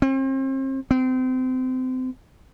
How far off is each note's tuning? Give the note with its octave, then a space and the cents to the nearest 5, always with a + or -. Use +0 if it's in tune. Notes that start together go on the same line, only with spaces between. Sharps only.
C4 +40
C4 -30